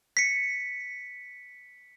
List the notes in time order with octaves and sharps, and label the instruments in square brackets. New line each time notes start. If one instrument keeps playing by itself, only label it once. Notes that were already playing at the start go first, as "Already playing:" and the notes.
[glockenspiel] B6 C#7